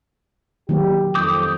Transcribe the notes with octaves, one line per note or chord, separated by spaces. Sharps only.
D#3 F#3 A#3 G4
F2 D6 D#6 G6